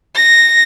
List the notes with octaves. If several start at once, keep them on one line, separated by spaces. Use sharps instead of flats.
A#6